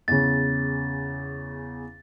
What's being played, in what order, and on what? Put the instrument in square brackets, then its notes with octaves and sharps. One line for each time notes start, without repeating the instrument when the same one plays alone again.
[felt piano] E2 C#3 [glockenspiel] A6